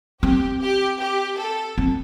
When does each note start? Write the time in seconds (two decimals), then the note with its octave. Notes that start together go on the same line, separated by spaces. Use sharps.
0.22 C4 G4
0.61 G4
1.00 G4
1.38 A4
1.78 C4